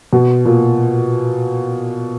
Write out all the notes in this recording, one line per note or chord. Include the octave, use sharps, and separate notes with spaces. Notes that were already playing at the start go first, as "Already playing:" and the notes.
B2
A#2